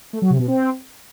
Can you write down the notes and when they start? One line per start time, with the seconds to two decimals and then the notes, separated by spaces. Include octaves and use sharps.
0.13 A3
0.22 F#3
0.30 C3
0.39 B2
0.48 C4